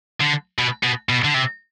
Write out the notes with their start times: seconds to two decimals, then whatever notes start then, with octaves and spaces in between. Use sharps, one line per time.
0.20 D3
0.58 B2
0.83 B2
1.09 B2
1.24 D3
1.34 C3